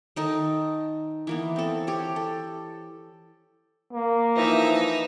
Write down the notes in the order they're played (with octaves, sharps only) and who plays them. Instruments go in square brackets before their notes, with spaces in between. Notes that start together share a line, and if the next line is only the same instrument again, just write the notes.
[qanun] D#3 D#4 A4
E3 A#3 B3
C4 A4
G4 C#5
A4
[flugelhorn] A#3
[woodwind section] E3 F3 [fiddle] D#4 E5